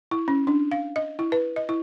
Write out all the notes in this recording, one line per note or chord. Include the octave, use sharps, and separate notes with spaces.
E4
C#4
D4
F5
D#5
E4
B4
D#5
E4